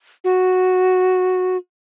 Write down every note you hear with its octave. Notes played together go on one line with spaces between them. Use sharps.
F#4